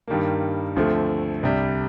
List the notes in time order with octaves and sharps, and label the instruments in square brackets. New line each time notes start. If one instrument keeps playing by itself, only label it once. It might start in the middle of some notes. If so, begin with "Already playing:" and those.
[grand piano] G2 D#3 G3 A#3
D2 D3 F3 A3 C4
C2 C3 G3 D4